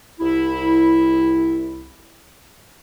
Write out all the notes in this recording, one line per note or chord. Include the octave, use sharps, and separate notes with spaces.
C2 E4